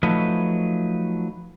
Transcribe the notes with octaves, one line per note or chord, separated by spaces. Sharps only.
F3 F#3 A3 D#4 B4